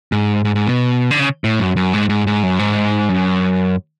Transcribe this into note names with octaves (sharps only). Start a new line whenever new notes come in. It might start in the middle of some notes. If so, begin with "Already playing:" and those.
G#2
G#2
G#2
B2
D3
C#3
A2
F#2
F#2
G#2
G#2
G#2
F#2
G#2
F#2